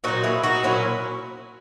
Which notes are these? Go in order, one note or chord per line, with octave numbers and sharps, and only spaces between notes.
A#2 F#3 D#4 F#4
E4 G#4
D#4 F#4
A#2 F#3 C#4 E4